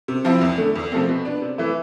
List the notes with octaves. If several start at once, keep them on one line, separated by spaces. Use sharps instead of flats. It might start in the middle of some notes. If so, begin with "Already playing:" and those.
C3
F3 C4 E4
E2
D3 A3
E2
C3 F3 A3 C4
B2
B3 D4
C3
E3 A3 E4